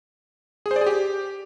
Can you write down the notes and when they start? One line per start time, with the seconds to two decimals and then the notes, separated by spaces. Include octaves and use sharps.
0.66 G#4
0.71 C5
0.76 D5
0.81 G#4
0.86 G4